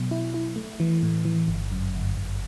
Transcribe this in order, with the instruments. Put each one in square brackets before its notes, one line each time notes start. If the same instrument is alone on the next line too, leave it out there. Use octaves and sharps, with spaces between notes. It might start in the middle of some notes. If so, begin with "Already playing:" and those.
Already playing: [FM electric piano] B2 F#3
E4
E4
A3
E3
A2
E3
G1
F#2
G1
G1